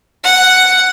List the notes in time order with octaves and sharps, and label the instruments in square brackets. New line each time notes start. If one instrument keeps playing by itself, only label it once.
[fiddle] F#5